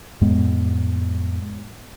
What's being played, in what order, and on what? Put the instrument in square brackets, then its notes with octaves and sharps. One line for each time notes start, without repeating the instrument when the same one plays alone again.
[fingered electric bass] F2 A2 G#3 B3